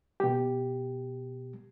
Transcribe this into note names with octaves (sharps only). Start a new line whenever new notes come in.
B2 G4